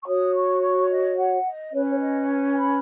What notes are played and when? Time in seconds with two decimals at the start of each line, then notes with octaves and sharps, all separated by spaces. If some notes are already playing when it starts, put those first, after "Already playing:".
0.02 C#6
0.05 F#4 C#5 D#6
0.33 C#6
0.61 C#6
0.89 D#5
1.17 F#5
1.45 D#5
1.71 C#4 B4 C#5
1.89 C#5
1.99 D#5
2.27 G#5
2.55 B5